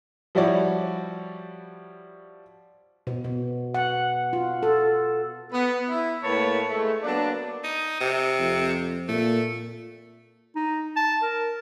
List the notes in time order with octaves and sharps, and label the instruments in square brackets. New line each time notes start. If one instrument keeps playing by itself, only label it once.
[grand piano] F3 G3 E4 F#4 C#5 D5
[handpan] B2
B2
F#5
F4
A4
[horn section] B3
E4
A2 A#3 B4 C#5 A5 B5
G#3 A3
F#3 A#3 B3 D4
[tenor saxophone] D#4
C3
[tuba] F2
[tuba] A#2 [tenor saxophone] A3
[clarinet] D#4
A5
A#4